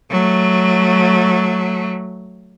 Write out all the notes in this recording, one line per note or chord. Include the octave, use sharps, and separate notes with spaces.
F#3 A3